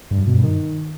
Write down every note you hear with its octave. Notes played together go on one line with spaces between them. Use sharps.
G2
F#2
B2
G2
D#3